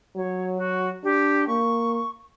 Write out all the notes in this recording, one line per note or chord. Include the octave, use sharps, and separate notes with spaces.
F#3 C#5
F#4
D4 G4
A#3 C#6